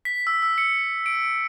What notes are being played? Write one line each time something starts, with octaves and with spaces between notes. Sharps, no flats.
B6
E6
E6
C#7
D7